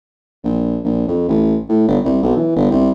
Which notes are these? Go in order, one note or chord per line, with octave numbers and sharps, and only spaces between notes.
A#1
A#1
F2
A1
A2
G1
C2
B1
E3
G1
C2